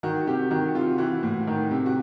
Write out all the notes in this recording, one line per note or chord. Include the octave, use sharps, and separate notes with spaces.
D#3 F#4
C3 G4
D#3 F#4
C3 F4
E3 F#4
A2
D#3
C3
F#4